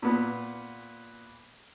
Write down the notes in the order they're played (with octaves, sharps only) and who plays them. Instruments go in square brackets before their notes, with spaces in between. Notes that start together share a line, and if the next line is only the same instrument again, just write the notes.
[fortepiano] A#2 B3